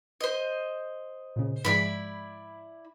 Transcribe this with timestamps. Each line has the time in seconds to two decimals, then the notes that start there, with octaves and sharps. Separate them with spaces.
0.21 C5 D#5
1.36 A#2 C#3
1.65 G#2 F3 G#3 E4 D5 B5